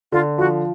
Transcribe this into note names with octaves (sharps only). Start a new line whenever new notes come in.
D3 F4
F3 F#4